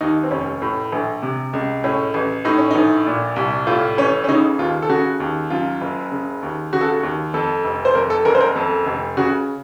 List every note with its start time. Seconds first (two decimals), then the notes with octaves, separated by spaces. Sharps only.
0.01 D#2 D#4
0.23 C4
0.31 F1 C#4
0.62 A2
0.92 A#1
1.22 C3
1.53 C#2
1.84 A2 C#4
2.14 A1
2.45 A2 D#4
2.58 C#4
2.71 A#1 D#4
3.06 A#2
3.36 C2
3.67 A2 F4
3.98 A1 C#4
4.24 C#4
4.28 C#3 D#4
4.59 D#2 F4
4.82 A4
4.89 C#3 F#4
5.20 D#2
5.50 F#2 F4
5.81 F#1
6.12 C#3
6.42 D#2
6.73 C#3 F#4
6.81 A4
6.89 F#4
7.03 D#2
7.34 F2 A4
7.65 F1
7.85 C5
7.95 F2 A#4
8.10 A4
8.25 F#1 A#4
8.35 C5
8.41 A#4
8.56 F2 A4
8.86 F1
9.17 C#3 F#4